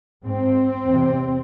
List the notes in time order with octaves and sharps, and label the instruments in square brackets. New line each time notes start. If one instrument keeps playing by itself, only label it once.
[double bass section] G#2 C4
E2 C3